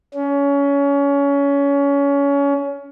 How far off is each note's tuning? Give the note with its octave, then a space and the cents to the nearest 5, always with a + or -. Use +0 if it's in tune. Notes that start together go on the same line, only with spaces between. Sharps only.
C#4 +25